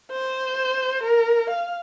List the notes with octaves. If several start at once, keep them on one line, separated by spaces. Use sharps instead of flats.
C5
A#4
F5